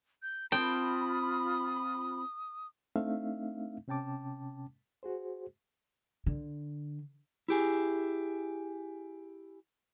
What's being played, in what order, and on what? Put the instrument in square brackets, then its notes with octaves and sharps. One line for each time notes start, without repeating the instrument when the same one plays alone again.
[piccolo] G6
[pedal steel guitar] C4 A5 [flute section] F4 B5 [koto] G5 [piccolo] D#6
[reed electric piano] A3 C4 D4 D#4 E5 F5
C3 C#4 G5 A5 D6
F#4 G#4 C5
[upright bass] D3
[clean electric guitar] E4 G4 G#4